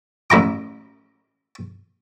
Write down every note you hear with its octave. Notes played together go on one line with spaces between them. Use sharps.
A1 E4 A#5 D6